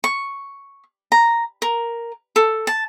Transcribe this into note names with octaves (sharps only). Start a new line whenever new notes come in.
C#6
A#5
A#4
A4
A5